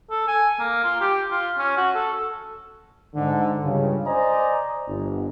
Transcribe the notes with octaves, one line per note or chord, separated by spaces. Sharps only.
A4
G#5
A#3
F4
G4
F4
C#4
F#4
A4
G#2 D3
C#2 G2 C#3
C5 D5 D#5 G#5 A#5
G1